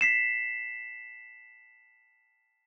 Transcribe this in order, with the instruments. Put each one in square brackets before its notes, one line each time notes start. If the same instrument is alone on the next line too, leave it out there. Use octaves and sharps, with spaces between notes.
[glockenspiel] B6 C7 E7